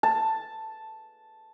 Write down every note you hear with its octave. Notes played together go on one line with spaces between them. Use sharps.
A5